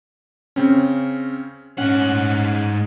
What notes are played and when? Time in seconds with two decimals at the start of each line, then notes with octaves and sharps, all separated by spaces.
0.56 C#3 C4 C#4
1.78 G#2 C#4 F#5